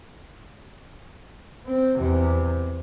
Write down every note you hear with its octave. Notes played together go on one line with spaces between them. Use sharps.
C4
E2 C3